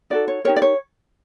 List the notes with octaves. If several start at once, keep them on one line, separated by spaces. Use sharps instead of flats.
D#4 F#4 A4 D5
C#5
D#4 G4 A#4 C#5
D5
C#5